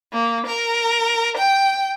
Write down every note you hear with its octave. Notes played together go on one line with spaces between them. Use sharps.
A#3
A#4
G5